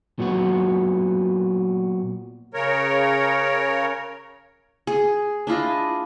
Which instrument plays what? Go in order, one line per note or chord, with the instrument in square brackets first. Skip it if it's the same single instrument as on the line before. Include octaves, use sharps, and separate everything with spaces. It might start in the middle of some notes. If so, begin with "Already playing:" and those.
[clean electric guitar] A#2 F#3 B3 F#4
[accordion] C#3 A#4 C#5
[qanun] G#4
D4 E4 F4 D#5